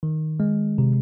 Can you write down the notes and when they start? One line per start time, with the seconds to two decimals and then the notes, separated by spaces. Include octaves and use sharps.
0.03 D#3
0.40 G#3
0.78 C3